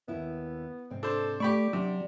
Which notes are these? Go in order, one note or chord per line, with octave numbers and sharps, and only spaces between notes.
D#2 B3 E4 E5
G#2 C3 C4
D4 A4 C5
A3 G4 D5 B5 C#6
C3 F#3 D4